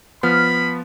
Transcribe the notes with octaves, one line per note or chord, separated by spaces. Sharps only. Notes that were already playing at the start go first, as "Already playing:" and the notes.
F3 B3 B5 F6